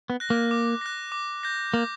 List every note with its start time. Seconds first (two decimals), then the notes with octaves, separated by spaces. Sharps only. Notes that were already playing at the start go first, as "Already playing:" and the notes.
0.10 B3
0.20 F#6 A#6
0.30 A#3
0.51 D6
0.81 F#6 A#6
1.12 D6
1.43 G6 A#6
1.74 A#3 D6